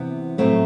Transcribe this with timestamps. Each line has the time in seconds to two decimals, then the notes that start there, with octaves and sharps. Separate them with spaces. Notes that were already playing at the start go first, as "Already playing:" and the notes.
Already playing: C3 E3 B3
0.38 A2 F#3 A3 C4